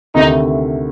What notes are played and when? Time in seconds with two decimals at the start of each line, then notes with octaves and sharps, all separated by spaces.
0.14 D2 C3 D#3 D#4